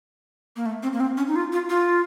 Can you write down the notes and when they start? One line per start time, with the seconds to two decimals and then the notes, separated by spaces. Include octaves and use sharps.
0.56 A#3
0.66 A3
0.83 C4
0.93 A#3
1.00 C4
1.17 C#4
1.27 D#4
1.36 F4
1.52 F4
1.69 F4